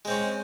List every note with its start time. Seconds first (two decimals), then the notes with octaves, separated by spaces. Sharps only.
0.05 G#3
0.08 C4
0.10 C#4